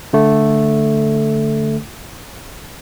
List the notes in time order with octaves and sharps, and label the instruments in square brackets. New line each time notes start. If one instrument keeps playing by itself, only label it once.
[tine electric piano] D3 A3